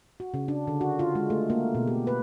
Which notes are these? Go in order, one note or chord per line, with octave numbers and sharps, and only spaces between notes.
F#4
C#3
D4
D3
F#4
F4
G#3
A3
A#3
B2
G4
B4